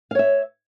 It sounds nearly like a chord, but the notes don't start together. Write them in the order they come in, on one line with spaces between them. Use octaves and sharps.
F5 C#5 E5